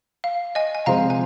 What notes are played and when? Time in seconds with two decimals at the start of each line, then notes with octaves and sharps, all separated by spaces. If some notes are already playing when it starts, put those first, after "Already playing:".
0.24 F5
0.55 D#5 G#5
0.75 G#5
0.86 C3 F3 G#3 F4 C5 F5 A#5
1.10 G#5